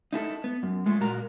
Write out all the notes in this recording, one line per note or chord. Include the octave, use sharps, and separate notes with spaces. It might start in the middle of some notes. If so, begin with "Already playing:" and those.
D#4 E4 G#4 A4
B3
F#2
G#3 A3 F4
A#2 F#4 A#4 A#5